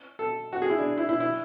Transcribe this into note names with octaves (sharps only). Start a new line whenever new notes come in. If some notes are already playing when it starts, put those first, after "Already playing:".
A4
F#4
G#4
E4
D4
E4
E4
E4